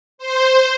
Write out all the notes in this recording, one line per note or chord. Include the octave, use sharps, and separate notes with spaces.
C5